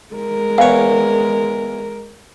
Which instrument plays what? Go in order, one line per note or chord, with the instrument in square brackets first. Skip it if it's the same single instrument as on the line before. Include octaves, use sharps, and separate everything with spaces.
[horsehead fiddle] G#3 A#4
[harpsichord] E2 C#5 [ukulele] B4 F5